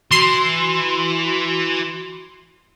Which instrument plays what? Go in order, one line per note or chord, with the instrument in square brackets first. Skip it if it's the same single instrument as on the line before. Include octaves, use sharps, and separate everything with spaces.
[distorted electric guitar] E3 [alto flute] F#4 [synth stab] C6